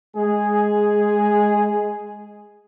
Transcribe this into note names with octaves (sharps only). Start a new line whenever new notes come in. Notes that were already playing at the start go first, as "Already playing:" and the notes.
G#3 G#4